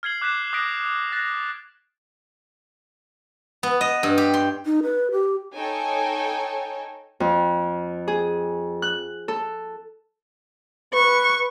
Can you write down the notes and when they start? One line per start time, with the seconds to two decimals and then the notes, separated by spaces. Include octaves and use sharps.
0.03 F6 G#6 C7 F#7
0.21 D6 F#6 G6 B6 E7
0.53 D6 D#6 F#6 A#6 B6 D7
1.12 F#6 A6 A#6
3.63 B3
3.81 D#5
4.03 G2
4.18 G4
4.34 C6
4.66 D#4
4.83 B4
5.12 G4
5.55 D#4 A4 C#5 G5 G#5
7.20 F2
8.08 G#4
8.82 F#6
9.28 A4
10.94 B4 C#6